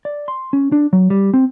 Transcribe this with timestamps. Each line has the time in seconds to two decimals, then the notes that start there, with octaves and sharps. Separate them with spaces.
0.05 D5
0.28 C6
0.53 C#4
0.72 D4
0.93 F#3
1.10 G3
1.34 C4